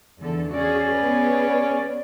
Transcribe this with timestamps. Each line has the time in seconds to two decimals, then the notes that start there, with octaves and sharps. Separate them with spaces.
0.20 E2 D3 A4
0.54 C#4 F#4 G#4 D5
0.95 B3 G#4 B4